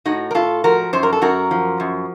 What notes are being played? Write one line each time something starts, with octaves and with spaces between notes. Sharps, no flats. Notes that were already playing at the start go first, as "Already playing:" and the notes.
A2 D#4 F#4
A#4
A2 F4 A4
F3 F#4 A#4
F#2 C5
A#4
A4
F#2 F#4 A#4
F3
F#2